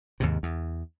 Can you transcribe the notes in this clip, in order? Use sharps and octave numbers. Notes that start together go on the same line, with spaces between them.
D#2 G#2 C3
E2